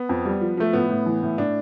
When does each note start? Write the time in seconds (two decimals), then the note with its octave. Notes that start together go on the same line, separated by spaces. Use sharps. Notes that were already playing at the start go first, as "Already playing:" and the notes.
Already playing: B3
0.09 F2
0.25 G3
0.41 F3
0.57 F3 A3
0.73 A2 B3
0.90 A2
1.06 E3
1.23 A2
1.38 A2 D4